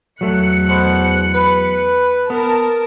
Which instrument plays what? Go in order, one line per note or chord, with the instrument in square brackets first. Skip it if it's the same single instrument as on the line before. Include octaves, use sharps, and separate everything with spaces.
[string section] E2 F#6 C#7 [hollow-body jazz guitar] F#3 A3
[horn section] B2 C5
B4
[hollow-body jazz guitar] B3 [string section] A#4 A5